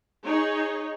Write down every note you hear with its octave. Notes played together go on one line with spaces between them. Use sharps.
D#4 G#4 C#5